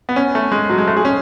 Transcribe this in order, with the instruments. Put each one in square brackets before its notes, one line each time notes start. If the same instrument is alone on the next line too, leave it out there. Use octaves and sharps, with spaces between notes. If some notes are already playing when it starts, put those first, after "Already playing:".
[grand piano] B3
C#4
A3
G#3
F#3
G#3
A3
G#4
C#4